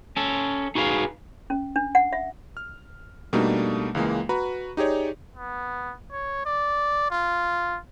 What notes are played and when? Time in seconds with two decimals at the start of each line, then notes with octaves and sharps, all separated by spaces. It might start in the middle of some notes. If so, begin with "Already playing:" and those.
0.16 C#4 A4
0.75 D#4 F#4 G#4 B4 F5
1.50 C#4
1.76 D4
1.95 F#5
2.13 E5
2.57 F6
3.33 B2 G3 A3 A#3 D4 D#4
3.95 C#2 E3 G#3 A#3
4.29 F#4 B4 A#5 B5
4.77 D#4 G4 G#4 C#5 D5
5.35 B3
6.12 C#5
6.46 D5
7.11 F4